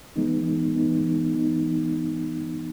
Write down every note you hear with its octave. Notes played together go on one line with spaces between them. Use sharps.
E3 G#3 B3 D#4
E3 G#3 B3 D#4
E3 G#3 B3 D#4